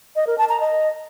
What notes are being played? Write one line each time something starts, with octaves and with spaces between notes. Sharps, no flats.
D#5
A#4
A5
A#5
D#5